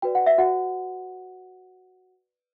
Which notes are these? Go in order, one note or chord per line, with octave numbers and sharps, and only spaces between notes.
F#4 B4 D5 G5
F#5
E5
F#4 F#5